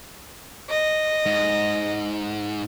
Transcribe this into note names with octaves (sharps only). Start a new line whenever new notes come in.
D#5
G#2